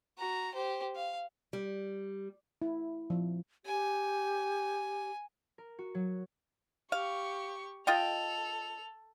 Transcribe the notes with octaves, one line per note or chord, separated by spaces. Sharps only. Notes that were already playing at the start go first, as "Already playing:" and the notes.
F#4 A#5
G4 C5
F5
G3
E4
F3
G4 G#5
A#4
F#4
F#3
G4 F5 C#6
F4 A4 D#5 G5 F7